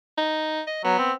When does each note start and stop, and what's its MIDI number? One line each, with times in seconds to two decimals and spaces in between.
0.17 0.61 63
0.67 0.80 75
0.84 0.98 54
0.84 1.11 59
0.98 1.13 60